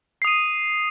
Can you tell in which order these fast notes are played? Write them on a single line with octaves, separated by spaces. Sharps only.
C7 D#6 D#7